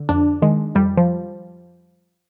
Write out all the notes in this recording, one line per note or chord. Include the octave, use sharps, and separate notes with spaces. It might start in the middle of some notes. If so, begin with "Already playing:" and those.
Already playing: D3
F2 D4
D#3 G#3
F2 G3
F3